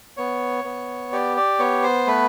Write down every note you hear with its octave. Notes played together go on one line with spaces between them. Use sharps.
B3 C#5
B3
G4 D5
D5
B3 C#5
C5
A3 B4